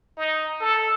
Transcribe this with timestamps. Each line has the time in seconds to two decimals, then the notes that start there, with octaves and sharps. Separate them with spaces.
0.17 D#4
0.61 A4